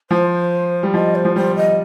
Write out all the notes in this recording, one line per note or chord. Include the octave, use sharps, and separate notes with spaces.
F3 C5
G3
F3 D#5
C5
F3
G3 C5
D#5